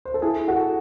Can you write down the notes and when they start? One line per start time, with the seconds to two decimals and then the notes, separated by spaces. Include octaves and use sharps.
0.05 C5
0.14 A4
0.22 E4 G#4
0.48 F#4 A4